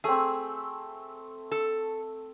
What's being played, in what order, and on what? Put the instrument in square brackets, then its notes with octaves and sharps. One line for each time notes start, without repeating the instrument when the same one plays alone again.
[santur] A3 C4 [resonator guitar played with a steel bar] G#4
[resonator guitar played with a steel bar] A4